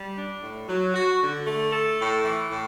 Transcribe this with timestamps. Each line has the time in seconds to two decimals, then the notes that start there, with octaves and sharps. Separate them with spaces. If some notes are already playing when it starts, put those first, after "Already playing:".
Already playing: G3
0.17 D4
0.43 A2
0.69 F#3
0.94 F#4
1.20 D3
1.47 A3
1.73 A4
1.98 A2
2.24 E3
2.50 A2